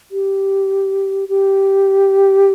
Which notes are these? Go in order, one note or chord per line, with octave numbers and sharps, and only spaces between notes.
G4
G4